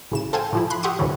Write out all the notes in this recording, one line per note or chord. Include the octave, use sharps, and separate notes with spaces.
A1 C#3 E7
A4 C5 F5 G5 G#5
A2 F3 E4
B5 C6 F#6
G4 E5 F#5 C6 C#6 D#6
D2 G2 C3 E3 F#3